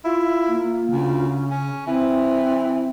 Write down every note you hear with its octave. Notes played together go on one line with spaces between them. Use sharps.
E4 F4
A#3
D2 C#3
C#4
E3 C4 E4